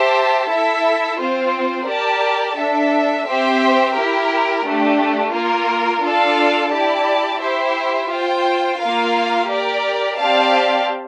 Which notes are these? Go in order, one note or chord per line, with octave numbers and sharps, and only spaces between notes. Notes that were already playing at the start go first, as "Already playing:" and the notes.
Already playing: G4 C5 E5 A5
E4 A4 E5
C4 F4 C5
G4 A#4 D5 A5
D4 A4 E5
C4 G4 C5 E5 G5
E4 G4 A#4
A3 D4 G4
A#3 F4 A#4
D4 F4 A4 D5 F5
E4 G4 D5 A5
E4 G4 C5 E5
F4 C5 G5
A#3 F4 A#4 F5
G4 A#4 D5
C4 G4 D5 F5 A5